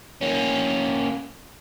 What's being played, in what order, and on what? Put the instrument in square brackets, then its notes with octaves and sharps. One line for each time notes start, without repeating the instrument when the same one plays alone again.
[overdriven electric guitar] A#3 C#4